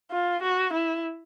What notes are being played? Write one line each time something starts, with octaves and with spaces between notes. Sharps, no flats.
F4
F#4
E4